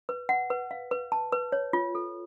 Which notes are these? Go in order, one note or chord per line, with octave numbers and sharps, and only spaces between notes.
B4
F#5
B4
F5
B4
A5
B4
C#5
F4
A4